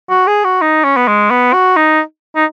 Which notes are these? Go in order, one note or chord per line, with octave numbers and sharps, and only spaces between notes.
F#4
G#4
F#4
D#4
C#4
B3
G#3
B3
F#4
D#4
D#4